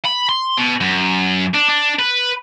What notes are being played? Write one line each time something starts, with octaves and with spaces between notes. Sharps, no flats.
B5
C6
B2
F#2
D4
D4
B4